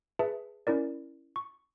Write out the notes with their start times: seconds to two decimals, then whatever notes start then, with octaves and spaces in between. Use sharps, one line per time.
0.19 G#4 B4 E5 A5
0.67 C#4 E4 A#4 D5
1.36 C#6